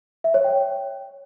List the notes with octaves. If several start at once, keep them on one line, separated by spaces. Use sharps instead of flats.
E5
C#5
G5